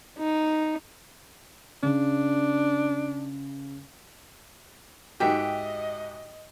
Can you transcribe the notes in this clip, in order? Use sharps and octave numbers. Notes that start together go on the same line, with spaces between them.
D#4
C#3 D4
G#2 F#4 G4 D#5 E5 G5